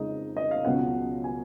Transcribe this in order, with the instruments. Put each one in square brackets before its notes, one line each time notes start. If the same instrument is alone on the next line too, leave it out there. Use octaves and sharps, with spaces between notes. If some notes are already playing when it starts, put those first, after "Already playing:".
Already playing: [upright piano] F2 C#3 G#3 D#4 D#5
D#5
F5
C#2 B2 F#3 C#4 F#5
G#5